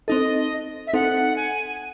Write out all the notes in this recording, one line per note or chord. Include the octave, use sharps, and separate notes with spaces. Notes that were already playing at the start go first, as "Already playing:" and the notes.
C4 D#4 A4 D#5
E5
C4 D#4 A4 F#5
G#5